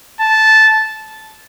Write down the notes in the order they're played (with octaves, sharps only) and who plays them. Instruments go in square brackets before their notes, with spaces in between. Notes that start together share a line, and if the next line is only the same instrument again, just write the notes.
[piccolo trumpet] A5